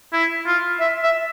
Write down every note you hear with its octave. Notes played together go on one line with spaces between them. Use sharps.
E4
F4
E5
E5